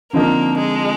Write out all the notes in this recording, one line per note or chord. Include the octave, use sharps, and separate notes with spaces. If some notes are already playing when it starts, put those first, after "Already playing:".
D3 F3 A#3 C4 D#4 A#4
G#3